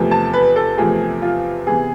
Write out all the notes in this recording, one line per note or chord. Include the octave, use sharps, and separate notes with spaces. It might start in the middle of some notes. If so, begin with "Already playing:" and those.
Already playing: E2 C3 F3 A3
A5
B4
A4
E2 C3 F3 A3 G#4
F4
C3 E3 B3 G#4